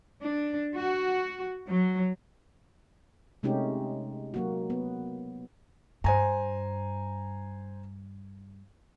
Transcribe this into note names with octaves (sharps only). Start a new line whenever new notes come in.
D4
F#4
F#3
C3 G#3 A3 C#4 D#4 G4
F#3 A#3 F#4
B3
G2 C5 G#5 A#5